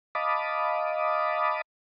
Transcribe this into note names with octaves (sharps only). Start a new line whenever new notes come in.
D#5 F5 A5 B5 D6 D#6